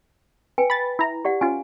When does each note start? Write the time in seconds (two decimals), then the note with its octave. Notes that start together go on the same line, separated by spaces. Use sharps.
0.58 B4 G5 G#5
0.70 B5 A6
0.99 E4 A#5
1.25 G4 D5 F#5
1.41 C#4 F4 G#5